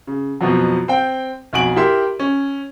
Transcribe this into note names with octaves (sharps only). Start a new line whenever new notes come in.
C#3
F2 B2 F3 F#3
C4 G5
B1 F2 F#4 G#5 D7 F#7
E4 G4 A#4 E5 C6
C#4